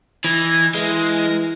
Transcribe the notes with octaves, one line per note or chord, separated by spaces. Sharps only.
E3 D#5
E3 G#3 A#4